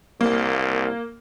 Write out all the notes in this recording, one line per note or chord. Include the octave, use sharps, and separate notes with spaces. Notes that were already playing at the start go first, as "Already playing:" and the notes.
C2 A#3